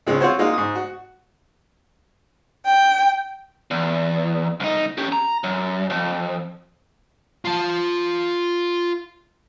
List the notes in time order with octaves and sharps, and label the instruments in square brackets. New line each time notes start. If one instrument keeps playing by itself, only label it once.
[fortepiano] C#2 G#3 C4 C#4
C4 F4 F#4 C5 C#5 F#5
G#3 A#3 D#4 F4 F#4
G#2 D#6
F#4
[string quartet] G5
[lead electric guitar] E2
C2 D#4
C#4 G4
A#5
F#2
F2
[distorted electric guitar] F4 A5